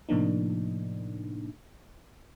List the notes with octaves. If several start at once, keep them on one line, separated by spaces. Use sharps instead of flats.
A2 C3 F3 A#3 D4 D#4